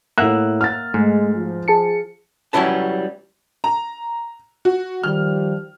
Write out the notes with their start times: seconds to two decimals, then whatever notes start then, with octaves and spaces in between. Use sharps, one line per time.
0.18 A2 A#3 E5 F#5 F#6
0.61 F6 A6
0.94 G#2 G#3 A3
1.36 F3
1.68 G#4 A5 C#7
2.53 F#3 G3 C#4 E4 B4 A5
3.64 A#5
4.65 F#4
5.03 D#3 F3 G3 F6